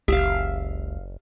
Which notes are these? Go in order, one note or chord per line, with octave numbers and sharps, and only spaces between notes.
F#1 C#2 G4 E5 F5